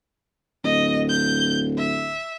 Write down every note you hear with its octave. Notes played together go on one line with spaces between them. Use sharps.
D1 D#5
G6
E5